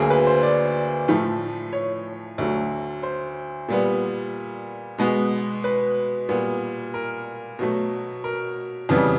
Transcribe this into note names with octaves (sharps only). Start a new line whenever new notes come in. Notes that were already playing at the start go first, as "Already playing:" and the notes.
Already playing: D2 D3 F#3 A#3 G#4
B4
C5
D5
A2 F3 A3
C#5
D2 D3 F#3 A3
C5
A#2 G3 B3
B2 G#3 B3
B4
A#2 G3 B3
A#4
B2 F#3 A3
A#4
F2 C#3 E3 G3 B3